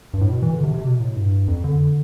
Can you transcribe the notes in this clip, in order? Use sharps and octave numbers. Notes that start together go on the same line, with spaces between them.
G2
A2
B2
E3
D3
C3
C3
B2
A2
G2
F2
D3